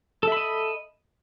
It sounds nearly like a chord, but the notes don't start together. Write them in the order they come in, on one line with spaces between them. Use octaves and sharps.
A4 E5 B5 D#5